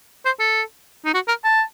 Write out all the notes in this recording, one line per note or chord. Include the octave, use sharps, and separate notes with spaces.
C5
A4
D#4
F#4
A#4
A5